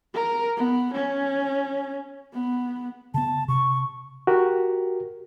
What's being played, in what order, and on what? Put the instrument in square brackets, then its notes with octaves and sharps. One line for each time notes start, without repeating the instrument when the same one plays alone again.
[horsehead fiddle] A#4
B3
C#4
B3
[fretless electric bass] C#3 B3 [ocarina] A5
[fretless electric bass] C3 [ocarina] C#6
[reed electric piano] F#4 G4 A#4